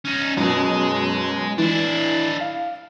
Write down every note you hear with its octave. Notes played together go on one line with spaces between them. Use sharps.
C#4 D#4
F#2 B2 G#3 G#4
E3 D4 E4
F5